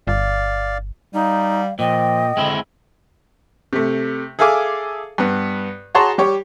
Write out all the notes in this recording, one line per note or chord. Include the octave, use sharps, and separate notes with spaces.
G1 D5 F5
G3 D#4 F5
A#2 F3 D#5 G5
D3 G#3 C4 E4
C3 A3
G#4 A4 E5 F5 G#5 D6
G2 B3
F#4 G#4 C#5 A5 A#5 C6
G3 G4 C#5